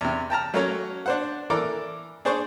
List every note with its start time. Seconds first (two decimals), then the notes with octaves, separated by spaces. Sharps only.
0.01 E2 C3
0.30 G5 A5 A#5 F6
0.54 F#3 A3 A#3 C#4 A#4 C#5
1.06 D4 C5 F#5
1.50 E3 A4 A#4 D5 D6
2.25 D4 G#4 C5 D5 C#6